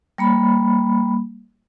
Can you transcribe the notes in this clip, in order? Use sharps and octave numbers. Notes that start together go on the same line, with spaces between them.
G3 A#3 B5